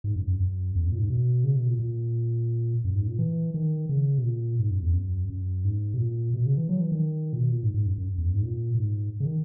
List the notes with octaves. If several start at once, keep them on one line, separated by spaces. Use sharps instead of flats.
G#2
F#2
F#2
F#2
E2
F#2
A#2
G#2
B2
C#3
B2
A#2
A#2
F#2
G#2
A#2
E3
D#3
C#3
B2
A#2
G#2
F#2
E2
F#2
F#2
G#2
B2
A#2
B2
C#3
E3
F#3
E3
D#3
A#2
B2
A#2
G#2
G#2
F#2
F#2
E2
F#2
G#2
A#2
A#2
G#2
C#3
D#3